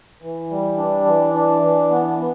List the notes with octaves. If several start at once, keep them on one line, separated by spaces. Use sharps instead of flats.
E3
G3
D4
E3
D4
E3
B3
B3